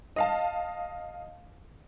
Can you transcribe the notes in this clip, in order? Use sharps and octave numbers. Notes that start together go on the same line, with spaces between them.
D#5 F5 A5